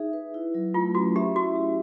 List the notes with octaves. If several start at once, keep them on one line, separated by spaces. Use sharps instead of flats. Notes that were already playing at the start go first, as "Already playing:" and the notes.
Already playing: D#4 G#4 E5
B4
E4
F#3
A3 F4
C#4 F#4
G4 E5
E4 F#4
G4